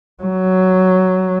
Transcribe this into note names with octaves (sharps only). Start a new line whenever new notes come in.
F#3